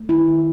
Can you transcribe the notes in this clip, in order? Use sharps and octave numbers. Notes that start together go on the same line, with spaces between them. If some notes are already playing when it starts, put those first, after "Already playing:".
Already playing: A3
D#3 E4
D#3